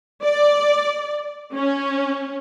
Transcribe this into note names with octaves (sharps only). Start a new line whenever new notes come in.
D5
C#4